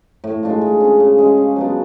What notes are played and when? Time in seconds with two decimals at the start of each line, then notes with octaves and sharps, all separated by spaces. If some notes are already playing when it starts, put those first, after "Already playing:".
0.24 A2
0.43 G#3 D4 F4
0.61 G#3
0.81 C#4 G#4
1.00 C#3
1.18 G#3 C#4 F4
1.37 C#3
1.56 F#3 B3 D4